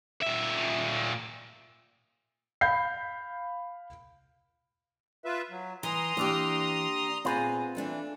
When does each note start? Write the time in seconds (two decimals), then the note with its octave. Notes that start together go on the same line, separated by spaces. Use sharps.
0.23 A#2 E5
2.61 F5 B5 G6 C7
5.24 F4 B4 E5
5.50 F#3
5.83 E3 A#4 A#5 C6 D#6
6.17 E3 A#3 D4 G4
7.25 A#2 B3 C4 F4 G#4 B4
7.75 E3 A3 D4 A4